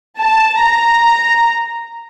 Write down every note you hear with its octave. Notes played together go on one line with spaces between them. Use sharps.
A5
A#5